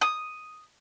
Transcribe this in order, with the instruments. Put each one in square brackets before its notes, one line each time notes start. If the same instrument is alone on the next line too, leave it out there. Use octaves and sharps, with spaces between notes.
[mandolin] D#6